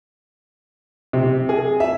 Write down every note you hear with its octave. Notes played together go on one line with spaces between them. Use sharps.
C3
G#4
E5